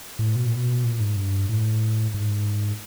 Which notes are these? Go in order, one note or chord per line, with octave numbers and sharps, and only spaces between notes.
A2
B2
A#2
B2
A#2
G#2
G2
A2
G#2